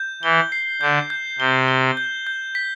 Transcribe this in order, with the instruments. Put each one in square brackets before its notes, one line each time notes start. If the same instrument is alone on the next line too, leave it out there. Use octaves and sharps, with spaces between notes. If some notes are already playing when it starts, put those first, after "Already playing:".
Already playing: [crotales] G6
[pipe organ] E3 [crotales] G7
[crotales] C7
[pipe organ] D3 [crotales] G6
[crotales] G6
[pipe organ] C3 [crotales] G7
[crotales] G7
G6
G6
B6